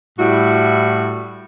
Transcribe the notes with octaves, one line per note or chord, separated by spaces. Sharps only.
A2 G3 E4 F#4